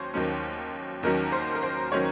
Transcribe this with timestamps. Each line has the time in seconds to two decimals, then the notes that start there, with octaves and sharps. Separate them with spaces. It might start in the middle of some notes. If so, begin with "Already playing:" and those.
Already playing: D#2 F#3 C#4 C5 C#5
0.14 D#2 D#3 F#3 C#4
1.03 D#2 D#3 F#3 C#4 A#4
1.32 C5
1.55 A#4
1.63 C5
1.92 D#3 F#3 C#4 C#5